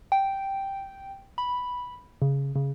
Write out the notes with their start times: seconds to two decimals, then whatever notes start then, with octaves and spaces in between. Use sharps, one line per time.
0.12 G5
1.38 B5
2.22 C#3
2.56 C#3